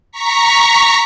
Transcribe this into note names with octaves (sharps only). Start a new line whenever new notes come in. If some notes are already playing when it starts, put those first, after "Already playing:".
A#5 C#6 B6